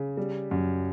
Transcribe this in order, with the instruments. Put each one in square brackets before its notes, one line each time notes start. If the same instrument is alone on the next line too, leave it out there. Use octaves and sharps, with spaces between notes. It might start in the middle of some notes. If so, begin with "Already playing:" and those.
Already playing: [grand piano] C#3
G3
F#2